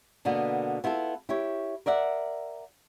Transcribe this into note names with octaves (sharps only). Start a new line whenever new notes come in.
B2 D3 A#3 B3
B3 E4 F4 G4 A4
E4 G4 C#5
A#4 D5 E5 F#5